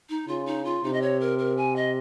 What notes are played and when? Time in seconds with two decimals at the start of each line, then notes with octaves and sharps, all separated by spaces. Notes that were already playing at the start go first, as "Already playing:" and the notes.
0.10 D#4
0.28 C#3 F4
0.46 D#4
0.65 F4
0.83 C3 D#4
0.93 D#5
1.02 C#5
1.20 A#4
1.39 A#4
1.57 G#5
1.76 D#5